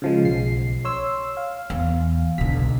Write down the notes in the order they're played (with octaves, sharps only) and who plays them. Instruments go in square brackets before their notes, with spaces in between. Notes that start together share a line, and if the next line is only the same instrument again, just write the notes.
[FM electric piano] C#3 F3 G#3
B1 C7
C#5 C6 E6
F5
[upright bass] E2
[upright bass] B1 D3 [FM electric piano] B6